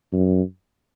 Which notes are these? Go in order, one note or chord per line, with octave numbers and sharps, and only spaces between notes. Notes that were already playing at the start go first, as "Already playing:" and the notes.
F#2